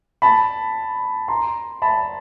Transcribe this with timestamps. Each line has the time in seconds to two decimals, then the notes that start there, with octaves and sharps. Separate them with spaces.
0.22 A5 B5
1.28 A#5 C6
1.82 A5 B5